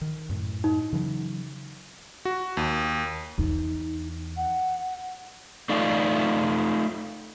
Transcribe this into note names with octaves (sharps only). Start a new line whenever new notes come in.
D#3
F#2 A2
D#4
C#3 E3 F#3
F#4
D#2
E2 D#4
F#5
A3 D#4 F4 D5 F5